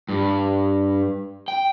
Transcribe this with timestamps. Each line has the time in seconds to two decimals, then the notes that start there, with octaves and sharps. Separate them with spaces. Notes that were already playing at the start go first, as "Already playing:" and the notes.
0.09 G2
1.48 G5